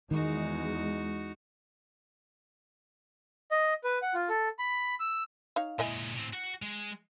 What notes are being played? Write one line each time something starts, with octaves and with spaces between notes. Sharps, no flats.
E2 D#3 G#3 D#4 F#4
D#5
B4
F#5
F4
A4
B5
E6
D#4 C#5 F5
A#2 G#3 E4 D#5 G#5
A2 C4
F#4 F#5
G#3